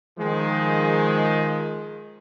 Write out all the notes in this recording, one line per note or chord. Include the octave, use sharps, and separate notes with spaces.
D#3 F3 G#3